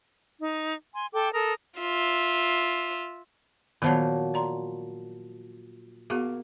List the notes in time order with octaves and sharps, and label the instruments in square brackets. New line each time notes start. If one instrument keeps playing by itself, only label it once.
[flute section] D#4
G#5 C6
A4 G5 D6
A4 A#4 D#6
[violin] F4 E5
[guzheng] A#2 F3 F#3 [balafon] D#3 B3 C5
[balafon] D5 A#5 C6
[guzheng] A#3 [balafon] B3 F#4 G#4